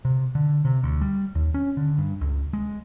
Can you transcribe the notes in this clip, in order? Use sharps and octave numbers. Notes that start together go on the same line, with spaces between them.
C3
D3
C3
D2
G3
D#2
C#4
D3
G2
C#2
G#3